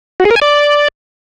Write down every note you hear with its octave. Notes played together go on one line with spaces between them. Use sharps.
F#4
G#4
A#4
G#5
D5